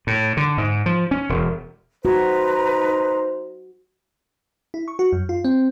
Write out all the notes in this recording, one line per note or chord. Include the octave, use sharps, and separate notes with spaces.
A2
D3
G#2
F3
C#4
E1
D#4 F#4 B4 C5 A#5
E4
C#6
F#4
F#2
F4
C4